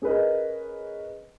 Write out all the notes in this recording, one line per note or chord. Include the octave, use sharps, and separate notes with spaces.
C#4 G#4 A#4 B4 D#5